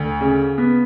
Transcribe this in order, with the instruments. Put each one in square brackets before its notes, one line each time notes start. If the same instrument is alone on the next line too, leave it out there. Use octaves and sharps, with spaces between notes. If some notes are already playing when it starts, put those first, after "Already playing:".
Already playing: [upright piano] D2
C#3
B3